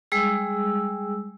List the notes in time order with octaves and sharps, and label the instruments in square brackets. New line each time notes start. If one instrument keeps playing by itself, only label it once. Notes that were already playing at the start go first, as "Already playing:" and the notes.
[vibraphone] G3 G#3 G#4 E6